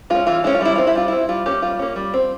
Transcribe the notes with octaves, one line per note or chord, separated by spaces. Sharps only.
G#3 C#4 F4
E3 F4
G#3 C#4 E4
F4
G3 E4
C4 F4
E4
G3 F4
C4 E4
G3 F4
A#3 C#4 G4
G3 F4
A#3 C#4
G3
C4